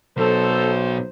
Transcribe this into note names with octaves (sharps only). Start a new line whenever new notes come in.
B1 B2 F#3 A4 C5